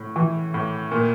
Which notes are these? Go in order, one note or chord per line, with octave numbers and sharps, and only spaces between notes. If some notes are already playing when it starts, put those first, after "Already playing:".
Already playing: A2
E3
A2
A#2